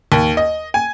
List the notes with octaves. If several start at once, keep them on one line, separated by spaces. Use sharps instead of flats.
D#2
D#5
G#5